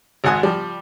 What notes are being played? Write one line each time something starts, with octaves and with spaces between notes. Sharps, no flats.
G#1 G#2 F#5 G#5 D#6
F3 G3